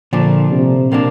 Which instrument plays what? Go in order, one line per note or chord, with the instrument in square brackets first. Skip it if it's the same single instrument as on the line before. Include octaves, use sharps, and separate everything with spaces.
[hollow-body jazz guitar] A#2 F3 D4 [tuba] D3
[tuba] C3
[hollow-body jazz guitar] C3 A#3 D4